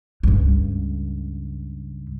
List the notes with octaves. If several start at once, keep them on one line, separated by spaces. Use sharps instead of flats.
C#2 G2